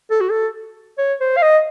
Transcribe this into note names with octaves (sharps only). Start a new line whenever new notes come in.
A4
F#4
A4
C#5
C5
F5
D#5